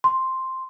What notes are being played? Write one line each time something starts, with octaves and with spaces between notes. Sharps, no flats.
C6